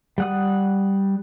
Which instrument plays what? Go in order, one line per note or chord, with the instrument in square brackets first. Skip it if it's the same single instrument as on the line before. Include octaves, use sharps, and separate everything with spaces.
[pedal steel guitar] G3 F#5 D#6